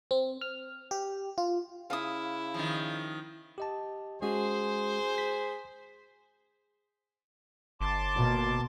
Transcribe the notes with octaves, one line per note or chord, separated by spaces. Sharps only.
C4
F6
G4
F4
C#3 E4 F5 D#6
D#3 F3
G4 D#5 A5
G#3 C#4 F#4 G#4 C5
G6 B6
G1 A5 C6 D6
B2 A#3